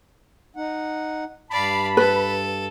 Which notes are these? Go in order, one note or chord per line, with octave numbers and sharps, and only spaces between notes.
D#4 F#5
G2 D5 F5 A5 B5
A4 B4